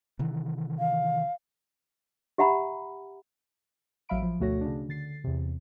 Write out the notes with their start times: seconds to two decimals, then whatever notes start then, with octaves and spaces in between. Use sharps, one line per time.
0.19 C3 D#3 E3
0.79 F5
2.38 G4 E5 F#5 A#5 B5
4.09 A1 F#3 E5 F5 B5 D7
4.22 F3
4.40 D2 B2 A3 F#4 C#5 A#6
4.61 C#3 D4
4.89 D3 A6 C7
5.24 E2 C3